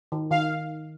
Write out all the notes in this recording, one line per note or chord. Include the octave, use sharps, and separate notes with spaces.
D#3
D#3 F5